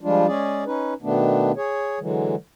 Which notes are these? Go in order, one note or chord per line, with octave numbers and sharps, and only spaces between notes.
F3 G3 G#3 D4 F4
G#3 C#4 G#4 D5
C#4 D#4 B4
B2 D#3 A3 B3 D4
G#4 C#5
D3 E3 F#3 G#3